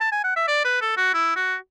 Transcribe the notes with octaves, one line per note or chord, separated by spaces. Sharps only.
A5
G#5
F#5
E5
D5
B4
A4
F#4
E4
F#4